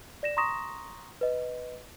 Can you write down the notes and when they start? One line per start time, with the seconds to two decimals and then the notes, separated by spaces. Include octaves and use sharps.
0.23 D5 A#6 E7
0.37 A#5 C6 C#6 D#6 A#6 E7
1.21 B4 D#5